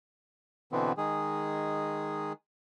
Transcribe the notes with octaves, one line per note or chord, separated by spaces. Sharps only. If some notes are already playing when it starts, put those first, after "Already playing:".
B2 D3 E3 B3 C4
D#3 G#3 G#4